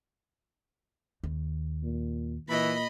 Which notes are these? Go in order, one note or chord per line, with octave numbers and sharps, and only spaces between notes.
D#2
A#2
A#2 E3 D#5 B5